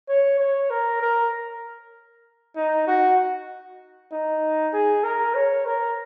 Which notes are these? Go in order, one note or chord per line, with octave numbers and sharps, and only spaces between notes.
C#5
C#5
A#4
A#4
D#4
F#4
D#4
G#4
A#4
C#5
A#4